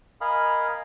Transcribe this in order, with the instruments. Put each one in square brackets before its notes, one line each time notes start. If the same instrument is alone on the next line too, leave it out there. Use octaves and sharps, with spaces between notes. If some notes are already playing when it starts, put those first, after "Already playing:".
[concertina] A#4 D#5 F5 G#5 B5 D#6